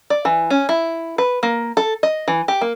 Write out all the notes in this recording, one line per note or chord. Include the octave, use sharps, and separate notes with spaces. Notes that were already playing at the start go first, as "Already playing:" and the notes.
D5
E3
C#4
E4
B4
A#3
A4
D#5
E3
G4
A#3